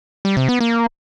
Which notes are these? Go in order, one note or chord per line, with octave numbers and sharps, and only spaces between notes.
G3
C3
B3
A#3